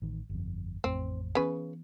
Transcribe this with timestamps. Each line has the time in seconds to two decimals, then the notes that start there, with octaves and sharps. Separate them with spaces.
0.02 A1 D#3
0.29 G1 F2
0.84 A1 F2 A3 C4
1.35 C#3 E3 B3 B4